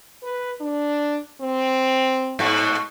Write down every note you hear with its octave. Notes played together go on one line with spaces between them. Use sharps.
B4
D4
C4
G#2 B2 F#4